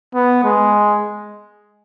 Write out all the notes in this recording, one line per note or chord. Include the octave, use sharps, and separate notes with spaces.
B3
G#3